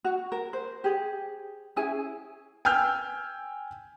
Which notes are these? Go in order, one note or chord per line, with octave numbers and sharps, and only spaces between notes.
F#4
A#4
C5
G4 G#4
C#4 E4 G#4 G#5
G5 G#5 E6 F6 G6